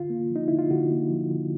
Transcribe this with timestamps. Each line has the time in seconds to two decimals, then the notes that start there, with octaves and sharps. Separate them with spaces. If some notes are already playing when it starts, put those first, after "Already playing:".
Already playing: D3 F4
0.10 A#3
0.30 F3
0.36 D#4
0.48 D3 E4
0.58 F4
0.70 D3 F#4
0.91 A#3
1.10 F3
1.31 D3